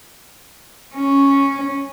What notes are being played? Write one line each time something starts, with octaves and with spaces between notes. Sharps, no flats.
C#4